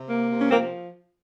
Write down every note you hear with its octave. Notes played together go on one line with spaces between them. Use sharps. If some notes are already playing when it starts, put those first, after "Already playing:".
Already playing: C3
A#3
C3
C#4
F3 A#3 C4